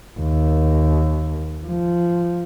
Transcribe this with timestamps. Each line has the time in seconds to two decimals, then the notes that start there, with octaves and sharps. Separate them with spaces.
0.20 D#2
1.67 F3